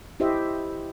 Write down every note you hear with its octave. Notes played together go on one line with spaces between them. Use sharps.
E4 G4 C5 D#5 E5